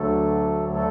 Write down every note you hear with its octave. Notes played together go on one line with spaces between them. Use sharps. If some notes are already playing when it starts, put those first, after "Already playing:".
Already playing: D2 D3 F#3 A3 A4
A3 A4